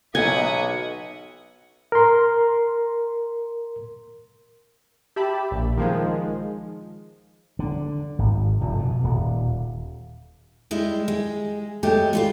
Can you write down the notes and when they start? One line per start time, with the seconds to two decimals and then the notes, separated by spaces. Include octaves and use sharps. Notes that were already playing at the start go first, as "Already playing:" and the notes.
0.15 B1 D#5 E5 F#5 G#5
1.92 A#4 C6
5.16 G4 E5 A5 B5
5.51 A#1
5.78 D#3 F3 G#3
7.59 D3
8.19 G#1
8.61 F1
8.79 B2
9.04 D#1
10.71 G3 G#3 E4
11.08 G#3
11.83 F#3 G#3 A3 G4
12.13 G3 F4 G4